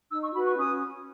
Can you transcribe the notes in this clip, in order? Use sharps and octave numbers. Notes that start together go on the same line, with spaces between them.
D#4 E6
C#6
F#4 B4 B5
C#6
C#4 D#6